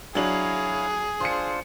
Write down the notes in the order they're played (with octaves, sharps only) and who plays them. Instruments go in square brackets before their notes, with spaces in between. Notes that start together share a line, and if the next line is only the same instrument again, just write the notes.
[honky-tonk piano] F#3 D4 F#7 [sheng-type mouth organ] E4 C#5 F5 [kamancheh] G#4
[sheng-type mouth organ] D4 F4 C5 [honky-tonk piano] C6 C#7